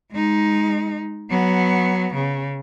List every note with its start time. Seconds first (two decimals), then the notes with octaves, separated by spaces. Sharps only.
0.12 G#3 D#4
1.30 F#3 B3
2.14 C#3